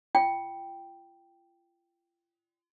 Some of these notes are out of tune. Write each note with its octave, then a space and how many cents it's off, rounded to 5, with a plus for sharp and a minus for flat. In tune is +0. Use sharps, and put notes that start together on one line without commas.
F4 -35 G5 +0